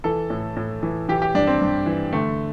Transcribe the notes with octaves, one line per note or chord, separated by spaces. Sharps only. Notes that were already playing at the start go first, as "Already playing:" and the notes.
E3 A4
A2
A2
E3
E3 G4
G4
G2 D4
C4
G2
E3
D3 A3